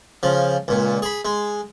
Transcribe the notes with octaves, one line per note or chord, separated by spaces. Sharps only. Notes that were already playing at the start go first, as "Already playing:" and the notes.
C#3 F3
C#2 A#2
G#4 B5
G#3